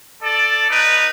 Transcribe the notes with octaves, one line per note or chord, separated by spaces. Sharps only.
A4 D5
D#4 B4